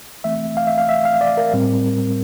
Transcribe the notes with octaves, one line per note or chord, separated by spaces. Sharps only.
E3 A3 C4 E5
F5
E5
F5
E5
F5
D5
A#4
A2 G3 C4